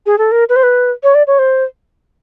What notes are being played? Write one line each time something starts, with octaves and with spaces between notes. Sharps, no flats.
G#4
A4
A#4
B4
C5
B4
C#5
D5
C#5
C5